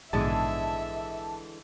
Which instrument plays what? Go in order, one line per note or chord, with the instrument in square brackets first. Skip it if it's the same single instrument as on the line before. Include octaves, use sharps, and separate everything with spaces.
[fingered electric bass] A#1 G#2 B2 [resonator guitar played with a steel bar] D3 E3 G#3 [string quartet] E5 [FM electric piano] A5